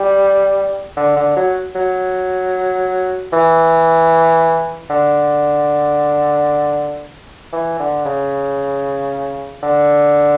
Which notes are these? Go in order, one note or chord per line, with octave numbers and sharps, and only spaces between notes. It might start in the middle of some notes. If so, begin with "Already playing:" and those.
Already playing: G3
D3
D3
F#3
F#3
E3
D3
E3
D3
C#3
D3